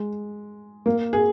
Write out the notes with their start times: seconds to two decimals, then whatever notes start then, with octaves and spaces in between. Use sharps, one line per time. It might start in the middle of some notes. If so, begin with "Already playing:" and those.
Already playing: G#3
0.86 A#3
1.13 G#4